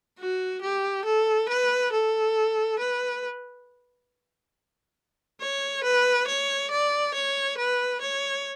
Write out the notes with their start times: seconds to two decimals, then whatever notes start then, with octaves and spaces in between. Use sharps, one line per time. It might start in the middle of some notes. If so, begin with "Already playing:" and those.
0.19 F#4
0.62 G4
1.05 A4
1.49 B4
1.92 A4
2.79 B4
5.41 C#5
5.84 B4
6.28 C#5
6.71 D5
7.14 C#5
7.58 B4
8.01 C#5